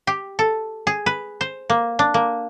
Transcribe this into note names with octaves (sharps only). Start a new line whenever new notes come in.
G4
A4
G#4
B4
C5
A#3
D4
A#3